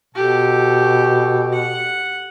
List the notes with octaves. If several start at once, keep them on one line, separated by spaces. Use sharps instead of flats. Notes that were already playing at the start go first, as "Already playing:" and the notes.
B2 G4 A4
F#5